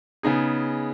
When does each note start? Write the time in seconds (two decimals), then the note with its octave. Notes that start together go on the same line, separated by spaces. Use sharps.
0.23 C#3 B3 D#4 G#4